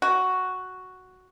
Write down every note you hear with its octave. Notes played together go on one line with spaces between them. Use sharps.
F#4